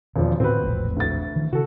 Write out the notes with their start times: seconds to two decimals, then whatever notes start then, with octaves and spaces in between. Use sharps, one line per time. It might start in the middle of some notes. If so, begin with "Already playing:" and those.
0.16 E1 E2 D#3 F3 D5
0.40 A2 D3 C4 C#4 F#4 B4
0.62 E1 A#1 A2
0.96 D2 A6
1.36 D#3 E3
1.53 C#3 F#4 A4